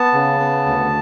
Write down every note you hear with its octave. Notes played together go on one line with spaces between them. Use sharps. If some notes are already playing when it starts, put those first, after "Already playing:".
Already playing: B3 A5
C#3
B3
D2